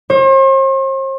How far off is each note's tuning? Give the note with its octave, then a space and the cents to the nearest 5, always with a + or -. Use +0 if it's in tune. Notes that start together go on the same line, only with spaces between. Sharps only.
C5 +45